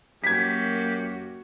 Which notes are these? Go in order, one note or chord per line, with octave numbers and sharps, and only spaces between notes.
F#2 A#3 F#4 G4 G#6 B6